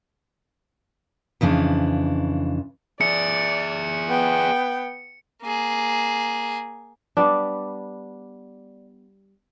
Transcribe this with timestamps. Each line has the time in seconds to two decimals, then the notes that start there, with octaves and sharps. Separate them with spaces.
1.41 F2 C#3 E3 D4
3.01 G#4 D5 E5 C#7
4.08 B3 G5
5.42 A#3 G#4
7.17 G3 B3 D4